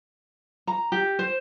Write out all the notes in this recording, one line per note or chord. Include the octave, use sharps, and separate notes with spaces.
A#5
G4
C5